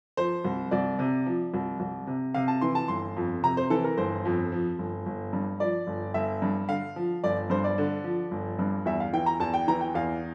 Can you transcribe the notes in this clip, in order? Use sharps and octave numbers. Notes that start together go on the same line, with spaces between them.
F3 C5
C2
C2 D5
C3
F3
C2
C2
C3
C3 F5
A5
E3 C6
A5
G1 C6
F2
C3 A#5
C5
E3 A4
A#4
G1 C5
F2
F3
G1
G1
G2
F3 D5
G1
G1 E5
G2
D3 F5
F3
G1 D5
G2 C5
D5
D3
F3
G1
G2
E2 E5
F5
E3 G5
A#5
E2 A5
G5
E3 A#5
G5
E2 F5